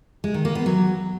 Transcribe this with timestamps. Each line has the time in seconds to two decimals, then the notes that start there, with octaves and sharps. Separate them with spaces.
0.24 G#3
0.34 D#3
0.45 A#3
0.55 B3
0.66 F#3